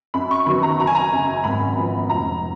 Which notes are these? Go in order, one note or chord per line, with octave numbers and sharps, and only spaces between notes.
F#2 B5
C#6
D#3 F#3 B3 B5
A#5
F#1 A#5
G#5
A#5
F#2 C#3
G#1 B5
F#2 F3 B3
F1 A#5